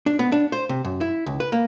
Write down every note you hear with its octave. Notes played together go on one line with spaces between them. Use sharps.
D4
B3
D4
C5
C3
F#2
E4
C#2
B4
A#3